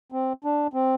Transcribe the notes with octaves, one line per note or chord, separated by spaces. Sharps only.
C4
D4
C4